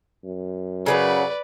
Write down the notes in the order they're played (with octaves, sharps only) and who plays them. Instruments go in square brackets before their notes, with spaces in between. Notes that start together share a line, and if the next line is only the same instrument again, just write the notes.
[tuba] F#2
[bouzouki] C#3 F3 F#3 [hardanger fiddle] B4 D5